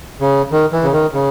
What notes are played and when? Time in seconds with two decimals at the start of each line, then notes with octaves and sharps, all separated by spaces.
0.21 C#3
0.52 D#3
0.72 E3
0.84 C#3
0.92 D#3
1.13 C#3